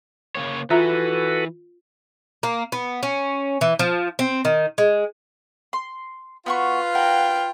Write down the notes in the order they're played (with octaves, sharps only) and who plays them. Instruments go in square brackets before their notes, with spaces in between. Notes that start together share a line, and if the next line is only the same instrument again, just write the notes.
[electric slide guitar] C#3 A#3 C#5
[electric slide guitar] E3 [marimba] F4 E5 A#5 [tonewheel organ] F#4 A4 B4
[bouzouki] A#3
B3
C#4
E3
F3
C4
D#3
G#3
[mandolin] C6
[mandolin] B3 F#4 C#6 [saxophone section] F4 B4 F5
[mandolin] A#4 F#5 [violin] G5